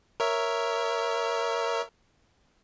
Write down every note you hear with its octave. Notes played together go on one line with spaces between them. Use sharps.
A#4 C#5 E5